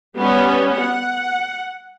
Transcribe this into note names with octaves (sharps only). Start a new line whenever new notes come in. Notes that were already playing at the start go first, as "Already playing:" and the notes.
G3 B3 C#4
F#5